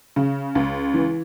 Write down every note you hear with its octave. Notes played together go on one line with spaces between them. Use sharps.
C#3
C#2
E3